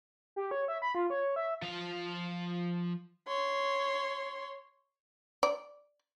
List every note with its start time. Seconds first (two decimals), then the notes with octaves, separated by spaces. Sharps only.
0.36 G4
0.51 C#5
0.68 E5
0.82 B5
0.95 F4
1.10 C#5
1.36 E5
1.62 F3 F5
3.28 C#5 C6
5.43 D5